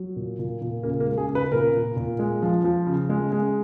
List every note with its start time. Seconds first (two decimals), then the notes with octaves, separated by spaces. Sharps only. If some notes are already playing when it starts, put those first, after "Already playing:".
Already playing: F#3
0.16 A#2
0.39 A#2
0.61 A#2
0.83 C#3 A#3
1.00 A#3
1.06 G#3
1.18 G#4
1.29 C#3
1.35 B4
1.52 A#2 A#4
1.74 A#2
1.96 A#2
2.19 G#3
2.42 F3
2.64 F3
2.87 C#3
3.10 G#3
3.32 G#3